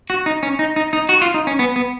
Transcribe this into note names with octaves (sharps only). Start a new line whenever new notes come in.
F#4
D#4
C#4
D#4
D#4
D#4
F#4
F4
D#4
C#4
B3
B3